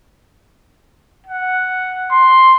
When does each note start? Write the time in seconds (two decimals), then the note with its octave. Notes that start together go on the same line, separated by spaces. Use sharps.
1.26 F#5
2.11 C6